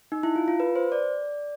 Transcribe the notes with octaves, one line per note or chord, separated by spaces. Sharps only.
D#4
E4
F4
F4
B4
C5
D5